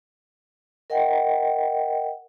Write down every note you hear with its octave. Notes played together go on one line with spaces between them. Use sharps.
A#4 D#5 F#5 G5